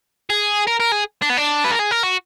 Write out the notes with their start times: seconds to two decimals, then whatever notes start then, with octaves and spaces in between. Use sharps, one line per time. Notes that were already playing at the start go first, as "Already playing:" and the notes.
0.30 G#4
0.67 A#4
0.80 A#4
0.92 G#4
1.22 D4
1.30 B3
1.38 D4
1.64 B4
1.72 A#4
1.79 G#4
1.91 A#4
2.03 F#4